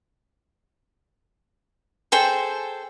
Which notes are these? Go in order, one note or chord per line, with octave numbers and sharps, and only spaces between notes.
G#4 A4 C5 G5